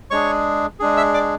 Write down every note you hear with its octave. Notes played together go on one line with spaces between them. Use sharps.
G#3 D4 G#4 C#5 C#6
G#3 D4 G#4
E5 E6
D5 D6